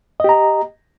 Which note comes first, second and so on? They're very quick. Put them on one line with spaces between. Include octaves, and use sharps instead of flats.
D#5 G4 A#5